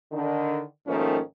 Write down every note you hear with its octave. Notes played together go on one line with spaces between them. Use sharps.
D3 D#3 D4
G#2 D#3 F3 A3 A#3 C#4